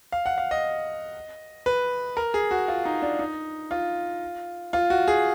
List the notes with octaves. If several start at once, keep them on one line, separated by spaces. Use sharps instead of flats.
F5
F#5
F5
D#5
B4
A#4
G#4
F#4
F4
D#4
D4
D#4
F4
F4
F#4
G#4